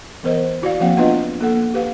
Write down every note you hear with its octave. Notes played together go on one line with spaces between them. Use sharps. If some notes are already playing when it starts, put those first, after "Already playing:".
E3 B3 A#4 C5 D#5
E4 F#4 D5 F5
F3 A#3 C4 F5 F#5
B3 D4 F4 B4 D#5
A#3 A4 F#5
G4 B4 F5